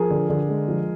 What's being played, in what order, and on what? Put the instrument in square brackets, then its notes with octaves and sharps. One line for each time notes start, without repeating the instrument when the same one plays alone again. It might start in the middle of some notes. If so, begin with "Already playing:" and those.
Already playing: [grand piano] F3 G#4 A#4
D3
D3
G#3
F3